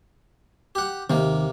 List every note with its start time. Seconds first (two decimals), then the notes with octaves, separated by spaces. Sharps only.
0.75 G4 F#5
1.10 D#2 C3 A#3